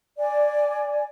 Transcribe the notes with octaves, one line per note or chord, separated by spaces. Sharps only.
D5 G#5